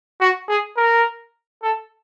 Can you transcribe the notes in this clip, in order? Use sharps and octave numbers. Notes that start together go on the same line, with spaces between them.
F#4
G#4
A#4
A4